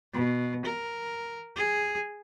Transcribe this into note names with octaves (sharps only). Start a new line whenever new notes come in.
B2
A#4
G#4